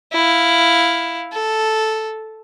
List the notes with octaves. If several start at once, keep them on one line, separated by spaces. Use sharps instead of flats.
E4 F5
A4